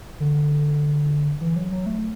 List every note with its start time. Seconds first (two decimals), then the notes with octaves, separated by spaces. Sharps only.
0.20 D3
1.41 E3
1.56 F#3
1.71 F#3
1.86 A3